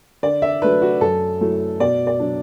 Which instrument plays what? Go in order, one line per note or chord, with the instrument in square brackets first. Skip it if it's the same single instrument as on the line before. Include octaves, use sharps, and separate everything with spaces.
[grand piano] D3 D5
E5
F#3 A3 D4 B4
F#4
F#2 A4
F#3 A3 E4
B2 D5
D5
F#3 D4